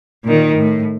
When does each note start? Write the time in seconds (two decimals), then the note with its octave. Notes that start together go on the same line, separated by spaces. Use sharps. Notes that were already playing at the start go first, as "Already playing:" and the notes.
0.24 A#2 D#3
0.56 A2